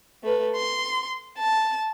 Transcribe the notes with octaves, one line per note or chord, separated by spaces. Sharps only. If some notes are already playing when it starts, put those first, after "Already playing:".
A3 B4
C6
A5